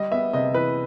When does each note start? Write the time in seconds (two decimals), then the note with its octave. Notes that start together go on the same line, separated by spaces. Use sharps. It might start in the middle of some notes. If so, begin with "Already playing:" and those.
Already playing: G3 D#5
0.12 B3 E5
0.33 C3 D#5
0.54 E3 B4